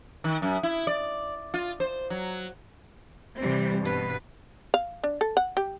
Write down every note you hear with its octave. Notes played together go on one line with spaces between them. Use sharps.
D#3
F#2
E4
D5
F4
C5
F#3
C3 E3 G3 C4
G2 B2 B4
F5
D4
A4
F#5
G4